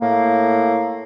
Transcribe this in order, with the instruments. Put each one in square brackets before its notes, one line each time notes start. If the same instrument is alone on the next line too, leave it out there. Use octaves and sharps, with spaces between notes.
[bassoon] A2 [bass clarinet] A#3